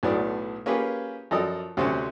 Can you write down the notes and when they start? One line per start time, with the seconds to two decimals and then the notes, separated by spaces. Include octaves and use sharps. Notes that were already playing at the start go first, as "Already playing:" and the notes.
0.03 B1 A2 F#3 B3 D5
0.66 A#3 C#4 F4 G4 G#4 B4
1.31 F#2 F3 A4 D5 D#5 D#6
1.77 D2 C3 C4 C#4